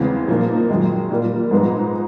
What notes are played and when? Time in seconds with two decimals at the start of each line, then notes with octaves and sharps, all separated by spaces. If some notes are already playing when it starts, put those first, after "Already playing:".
Already playing: E2 C#3 E3 G#3 C4
0.28 A#2 F3 A#3 D#4
0.70 F#2 D#3 G#3
1.11 A#2 G3 A#3
1.51 G#2 F3 G#3 B3 D#4